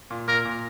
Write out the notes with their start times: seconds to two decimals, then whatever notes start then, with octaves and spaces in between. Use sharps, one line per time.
0.10 A#2
0.28 A#2 A#4
0.45 A#2